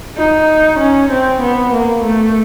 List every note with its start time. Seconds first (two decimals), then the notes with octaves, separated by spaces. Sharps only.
0.17 D#4
0.79 C#4
1.11 C4
1.41 B3
1.73 A#3
2.04 A3